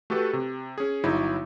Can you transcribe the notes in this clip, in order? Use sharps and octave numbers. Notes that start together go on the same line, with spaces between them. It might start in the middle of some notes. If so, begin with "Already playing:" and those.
A3 F#4 G4 A4 B4
C3
C#4 G#4
G1 F#3 D#4 E4